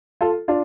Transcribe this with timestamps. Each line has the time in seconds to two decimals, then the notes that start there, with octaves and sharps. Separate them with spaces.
0.21 F4 A4
0.48 D4 F4